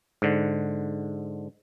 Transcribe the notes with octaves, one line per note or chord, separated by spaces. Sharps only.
G#2 D3